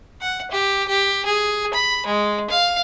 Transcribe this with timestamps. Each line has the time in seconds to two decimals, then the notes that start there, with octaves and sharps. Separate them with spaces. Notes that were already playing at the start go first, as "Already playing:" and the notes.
0.21 F#5
0.51 G4
0.88 G4
1.25 G#4
1.74 B5
2.06 G#3
2.50 F5